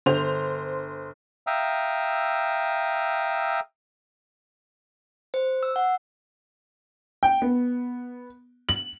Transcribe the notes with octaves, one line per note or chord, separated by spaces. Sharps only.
G1 C5 F7
E5 F5 G5 A#5 D#6 E6
C5
E6
F#5
G5
B3
F#7